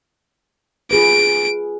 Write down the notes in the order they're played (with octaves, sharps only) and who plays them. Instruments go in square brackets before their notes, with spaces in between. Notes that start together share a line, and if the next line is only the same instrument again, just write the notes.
[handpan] F4 G#4 B4 [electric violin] D7